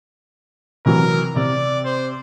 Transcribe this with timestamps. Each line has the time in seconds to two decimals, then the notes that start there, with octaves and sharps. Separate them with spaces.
0.86 C3 E3 F#3 A#4
1.36 C3 D5
1.85 C5